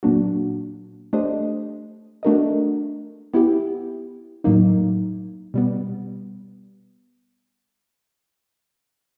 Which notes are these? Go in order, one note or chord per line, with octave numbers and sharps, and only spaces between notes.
A#2 F#3 A#3 D4 F#4
A3 D4 G4 C5 D#5
A3 D4 F#4 A#4 D#5
B3 E4 G4
A2 F#3 A#3 D#4
B2 G3 B3